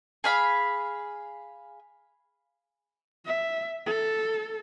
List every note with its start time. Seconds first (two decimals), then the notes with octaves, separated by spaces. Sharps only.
0.24 G#4 F5 B5
3.26 E5
3.86 A4